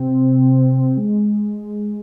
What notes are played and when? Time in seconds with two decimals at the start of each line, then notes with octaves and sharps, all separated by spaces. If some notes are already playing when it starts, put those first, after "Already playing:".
Already playing: C3 C4
0.97 G#3